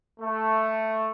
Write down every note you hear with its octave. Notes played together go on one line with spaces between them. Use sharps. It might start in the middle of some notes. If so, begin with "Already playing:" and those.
A3